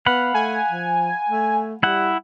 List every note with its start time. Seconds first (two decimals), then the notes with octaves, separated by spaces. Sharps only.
0.06 B3 F5 F#5 B5
0.34 A3 G#5
0.71 F3
1.29 A3
1.83 G3 E4 F#5